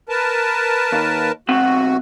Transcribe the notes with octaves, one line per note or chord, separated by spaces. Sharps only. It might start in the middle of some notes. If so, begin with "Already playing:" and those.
A#4 B4 A5
D#2
B1 C4 F#4 F#5